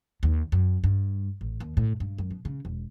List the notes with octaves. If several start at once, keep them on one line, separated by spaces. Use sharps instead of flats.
D#2
F#2
G2
A1
D#2
A2
G2
F#2
B2
C#3
E1